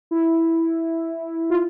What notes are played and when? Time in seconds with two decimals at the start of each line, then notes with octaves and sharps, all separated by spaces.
0.11 E4
1.50 F4